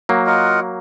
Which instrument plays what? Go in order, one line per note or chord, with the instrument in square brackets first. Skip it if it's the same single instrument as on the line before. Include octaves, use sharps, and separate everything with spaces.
[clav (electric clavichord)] F#3 A#3
[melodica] F4 A#4 D#5 F#5